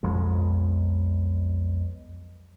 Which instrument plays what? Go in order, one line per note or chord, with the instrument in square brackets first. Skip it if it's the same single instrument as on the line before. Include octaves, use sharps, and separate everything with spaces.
[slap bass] B1 F2 F3 G#3